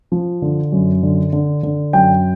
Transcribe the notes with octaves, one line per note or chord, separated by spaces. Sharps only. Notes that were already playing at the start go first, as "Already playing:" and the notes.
F3
D3
F#2
D3
D3
D3
F#2 G5